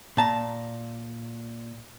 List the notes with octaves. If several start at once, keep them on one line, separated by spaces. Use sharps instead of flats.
A#2 A5 A#5